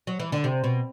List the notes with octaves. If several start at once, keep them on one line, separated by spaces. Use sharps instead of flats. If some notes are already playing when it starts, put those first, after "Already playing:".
F#3
E3
D3
C3
B2